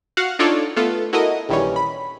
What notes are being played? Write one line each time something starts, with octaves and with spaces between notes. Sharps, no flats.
F#4 F5 F#5
D4 D#4 F4 A4 C#5 D5
A3 B3 F4 A4
E4 F#4 A4 A#4 D#5 D#6
A#1 D#3 E3 G3 C#4
B5